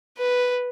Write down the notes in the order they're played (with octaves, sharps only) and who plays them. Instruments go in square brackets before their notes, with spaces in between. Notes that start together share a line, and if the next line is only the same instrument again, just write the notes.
[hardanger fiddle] B4